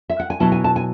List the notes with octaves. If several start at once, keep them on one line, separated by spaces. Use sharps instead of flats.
E5
F#5
G#5
B2 F#3 B3 E4 A5
G#5
A5
G#5